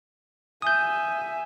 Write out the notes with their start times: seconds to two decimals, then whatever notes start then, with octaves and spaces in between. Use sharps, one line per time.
0.62 E5 G#5 D#6 G6